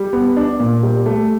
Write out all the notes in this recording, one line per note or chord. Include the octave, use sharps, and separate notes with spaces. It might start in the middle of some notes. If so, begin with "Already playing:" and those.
Already playing: G3
B3
D4
A#2
G3
A3